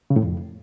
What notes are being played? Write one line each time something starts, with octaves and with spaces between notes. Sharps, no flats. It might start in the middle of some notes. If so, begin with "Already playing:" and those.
C#3
A2
F2